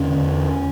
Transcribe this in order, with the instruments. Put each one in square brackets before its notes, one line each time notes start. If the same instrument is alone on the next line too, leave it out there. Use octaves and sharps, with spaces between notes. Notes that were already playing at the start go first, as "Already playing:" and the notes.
Already playing: [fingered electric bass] E2 D3 C#4